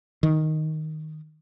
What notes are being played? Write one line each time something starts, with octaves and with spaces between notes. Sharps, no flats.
D#3